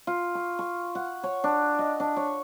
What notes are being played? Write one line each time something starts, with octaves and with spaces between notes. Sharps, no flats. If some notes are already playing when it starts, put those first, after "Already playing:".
F4
C#6
C#6
F#5
C#5
D4
D#5
D4
C#5